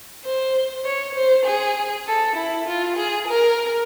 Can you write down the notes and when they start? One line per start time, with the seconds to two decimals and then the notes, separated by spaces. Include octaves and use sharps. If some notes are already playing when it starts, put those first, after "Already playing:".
0.24 C5
0.85 C#5
1.15 C5
1.46 G#4
2.07 A4
2.36 E4
2.66 F4
2.97 G#4
3.28 A#4